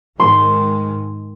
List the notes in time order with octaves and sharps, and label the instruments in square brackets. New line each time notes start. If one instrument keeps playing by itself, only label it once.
[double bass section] G#2 D#3 G#3 [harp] C6